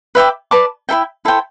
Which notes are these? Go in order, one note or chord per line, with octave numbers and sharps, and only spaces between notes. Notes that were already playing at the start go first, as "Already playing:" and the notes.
B4 E5 G5 D6
B4 D5 A5 D6
E4 A4 E5 G5
E4 A4 C5 G5